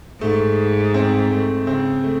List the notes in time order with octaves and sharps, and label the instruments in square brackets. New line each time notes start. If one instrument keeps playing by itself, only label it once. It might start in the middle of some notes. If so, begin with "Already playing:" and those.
[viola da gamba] G#2 [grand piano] A3
[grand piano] C4
A3
[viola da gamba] C#3 [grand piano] C4
[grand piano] A3